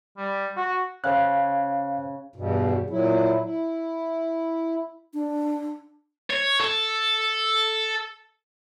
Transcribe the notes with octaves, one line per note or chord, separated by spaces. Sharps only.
G3
F#4
C#3 C5 F5 F#6
E2 G2 B2
A#2 F#3 E4
E4
D4
C#5
A4